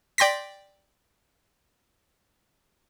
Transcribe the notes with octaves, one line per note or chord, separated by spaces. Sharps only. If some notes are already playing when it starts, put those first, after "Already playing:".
D5 G5 C6 A#6 B6